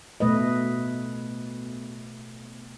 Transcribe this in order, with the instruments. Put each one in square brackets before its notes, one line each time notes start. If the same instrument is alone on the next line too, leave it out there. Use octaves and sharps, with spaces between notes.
[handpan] B2 A3 B4 D#5